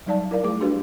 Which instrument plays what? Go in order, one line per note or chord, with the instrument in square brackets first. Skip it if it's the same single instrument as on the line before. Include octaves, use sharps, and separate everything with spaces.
[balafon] F#3 G3 D#4 D5 F5 A5
E4 A#4 D5 F5
A3 G#4 D6
D4 F#4 G4 B4